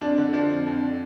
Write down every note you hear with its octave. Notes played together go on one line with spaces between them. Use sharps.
F2 D4
D3
F3 D4
F2
F2
D3